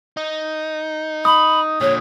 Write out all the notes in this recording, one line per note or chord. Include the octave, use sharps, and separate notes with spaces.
D#4
B5 D#6
A#2 D3 C#5